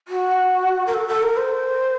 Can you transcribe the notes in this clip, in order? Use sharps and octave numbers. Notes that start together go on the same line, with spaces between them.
F#4
A#4
A4
A4
A#4
C5